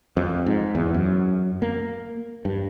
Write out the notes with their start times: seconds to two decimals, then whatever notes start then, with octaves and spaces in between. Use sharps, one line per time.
0.17 F2
0.46 G#2
0.75 E2
0.94 F#2
1.62 A#3
2.45 G2